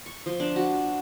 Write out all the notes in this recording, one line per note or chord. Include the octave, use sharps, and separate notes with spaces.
C#6
F3
D4
F#4